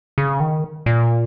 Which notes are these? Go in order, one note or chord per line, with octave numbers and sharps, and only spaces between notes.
C#3
D#3
A#2